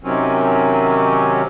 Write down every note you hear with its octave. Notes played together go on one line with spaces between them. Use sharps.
C3 D#3 F#3 C4 C#4